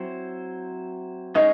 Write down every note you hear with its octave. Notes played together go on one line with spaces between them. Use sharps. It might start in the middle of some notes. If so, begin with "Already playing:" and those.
Already playing: F#3 C4 E4 C5
G#3 C#4 D#4 G#4